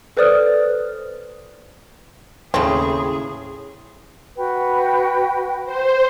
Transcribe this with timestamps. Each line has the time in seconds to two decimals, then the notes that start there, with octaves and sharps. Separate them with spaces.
0.17 A4 B4 C5 D5 D#6 F6
2.54 D#2 A2 C#3 C4 E4 G#4 B5
4.37 F#4 B4 G5
5.65 C5